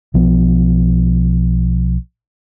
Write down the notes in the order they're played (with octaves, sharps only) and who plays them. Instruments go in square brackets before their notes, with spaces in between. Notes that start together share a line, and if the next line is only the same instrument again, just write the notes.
[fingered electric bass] B1 F3 B3